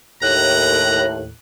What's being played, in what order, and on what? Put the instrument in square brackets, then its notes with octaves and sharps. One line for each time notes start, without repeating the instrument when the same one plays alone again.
[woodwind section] D#2 A2 [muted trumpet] A#5 [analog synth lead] F#6